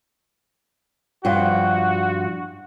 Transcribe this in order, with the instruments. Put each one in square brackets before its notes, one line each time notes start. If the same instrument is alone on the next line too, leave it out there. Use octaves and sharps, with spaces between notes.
[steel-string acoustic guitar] G2 F3 G5 [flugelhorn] F#4